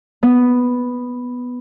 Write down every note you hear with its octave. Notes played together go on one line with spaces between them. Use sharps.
B3